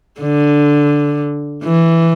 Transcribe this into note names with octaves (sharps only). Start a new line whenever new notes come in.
D3
E3